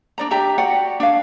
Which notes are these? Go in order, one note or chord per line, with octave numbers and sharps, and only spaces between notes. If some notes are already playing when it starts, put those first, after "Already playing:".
D4 D5 A#5
D4 G4 E5 A#5
F#4 D5 F#5 G5
D4 F5